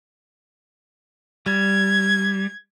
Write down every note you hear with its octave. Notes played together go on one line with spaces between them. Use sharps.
G3 G#6